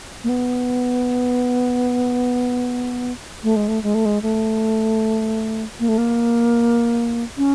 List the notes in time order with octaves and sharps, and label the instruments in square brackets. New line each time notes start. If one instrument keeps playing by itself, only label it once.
[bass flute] A#3
B3
A3
G#3
A3
G#3
A3
G#3
A3
A#3
A3
A#3
C#4